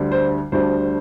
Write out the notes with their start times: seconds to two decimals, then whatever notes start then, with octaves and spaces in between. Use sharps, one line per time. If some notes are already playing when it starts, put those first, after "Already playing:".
Already playing: D2 D3 G3 D4
0.12 C5
0.52 D2 D3 G3 D4 C5